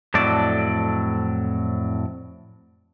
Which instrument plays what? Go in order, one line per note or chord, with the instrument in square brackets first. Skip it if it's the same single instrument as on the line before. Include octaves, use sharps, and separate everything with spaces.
[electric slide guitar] F2 A2 F#3 A4 D5